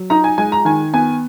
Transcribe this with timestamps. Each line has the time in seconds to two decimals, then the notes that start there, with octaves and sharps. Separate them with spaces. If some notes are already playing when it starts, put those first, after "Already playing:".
Already playing: F#3
0.10 D#4 A#5
0.24 G#5
0.38 G#3 G#5
0.52 A#5
0.65 D#3 G#5
0.93 B3 G#5